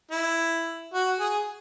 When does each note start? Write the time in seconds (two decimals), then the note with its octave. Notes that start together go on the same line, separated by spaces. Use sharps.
0.11 E4
0.94 F#4
1.20 G#4